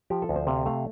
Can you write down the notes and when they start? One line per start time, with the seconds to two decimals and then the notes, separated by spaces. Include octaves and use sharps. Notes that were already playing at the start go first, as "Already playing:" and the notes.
0.10 F3 G4
0.22 A4
0.29 D2
0.36 C5
0.47 C3 F5
0.66 A3 F5